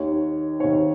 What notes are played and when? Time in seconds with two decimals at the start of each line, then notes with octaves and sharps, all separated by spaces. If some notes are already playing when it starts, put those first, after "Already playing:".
Already playing: D#2 D#3 C#5
0.60 D#2 D#3 C#5